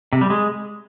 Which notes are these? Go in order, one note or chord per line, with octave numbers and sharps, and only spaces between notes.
C3
G3
G#3